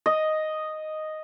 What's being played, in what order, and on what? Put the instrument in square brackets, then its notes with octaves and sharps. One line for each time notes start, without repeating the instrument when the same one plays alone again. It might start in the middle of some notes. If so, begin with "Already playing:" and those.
[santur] D#5